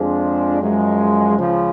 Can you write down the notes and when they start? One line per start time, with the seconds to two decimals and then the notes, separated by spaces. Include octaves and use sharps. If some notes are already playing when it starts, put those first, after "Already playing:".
Already playing: F2 F3 G#3 D4 G#4
0.60 F#2 F3 G#3
1.39 C#2 C#3 F3